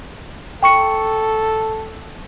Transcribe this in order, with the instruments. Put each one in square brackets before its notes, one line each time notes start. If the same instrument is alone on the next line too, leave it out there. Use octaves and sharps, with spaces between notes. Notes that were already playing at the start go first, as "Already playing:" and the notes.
[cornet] A4 [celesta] G5 C#6 C#7